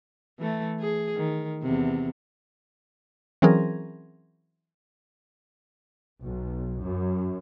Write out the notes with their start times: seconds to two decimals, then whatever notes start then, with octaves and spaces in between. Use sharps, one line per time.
0.39 E3 A3
0.80 G#4
1.16 D#3
1.62 E2 C3
3.42 E3 F#3 C4 C#4 G#4 A#4
6.23 B1
6.84 F#2